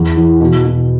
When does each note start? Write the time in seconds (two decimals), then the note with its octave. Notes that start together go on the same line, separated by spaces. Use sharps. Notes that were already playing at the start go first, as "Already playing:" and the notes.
Already playing: E2
0.17 E3
0.41 B2
0.64 B2